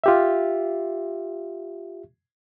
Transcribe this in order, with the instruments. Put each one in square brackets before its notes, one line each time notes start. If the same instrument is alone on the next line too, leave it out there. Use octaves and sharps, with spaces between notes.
[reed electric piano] F4 G4 E5